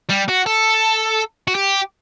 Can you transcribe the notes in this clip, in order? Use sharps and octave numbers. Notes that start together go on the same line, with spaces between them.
G3
F#4
A4
F#4
G4